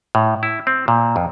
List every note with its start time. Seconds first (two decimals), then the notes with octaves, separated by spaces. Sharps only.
0.15 A2
0.43 E4
0.67 C4
0.88 A#2
1.16 F2